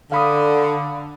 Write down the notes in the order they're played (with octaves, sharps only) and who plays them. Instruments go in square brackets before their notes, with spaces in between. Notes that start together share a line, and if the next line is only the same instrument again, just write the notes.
[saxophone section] D3 [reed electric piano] F5 B5 D#6